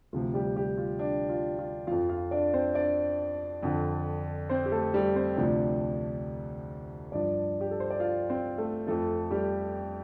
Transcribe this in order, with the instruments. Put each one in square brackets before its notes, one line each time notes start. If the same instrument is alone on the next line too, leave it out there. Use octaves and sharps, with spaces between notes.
[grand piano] D2 C3 F3 F4
G3 G4
G3 G4
F4
D4
F4
F4
F2 F3 F4 F5
F4 F5
D4 D5
C4 C5
D4 D5
F2 D3 F3
C4 C5
G4
A3 A4
G3 G4
C4 C5
D2 C3 F3 D4 D5
G2 F3 D4 D5
G4
A4
C5
D5
F4 F5
C4 C5
A3 A4
F2 F3 A3 A4
G3 G4